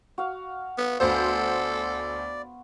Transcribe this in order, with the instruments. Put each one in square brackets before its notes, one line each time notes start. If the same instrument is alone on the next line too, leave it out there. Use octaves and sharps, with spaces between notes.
[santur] F#4 F5
[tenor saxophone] B3
[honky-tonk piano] D2 C5 [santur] B3 C6 [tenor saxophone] A4 [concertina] D5